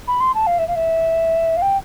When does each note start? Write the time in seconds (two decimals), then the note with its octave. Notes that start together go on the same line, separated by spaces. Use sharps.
0.07 B5
0.20 C6
0.34 A5
0.47 F5
0.58 E5
0.68 F5
0.75 E5
1.57 F5
1.62 G5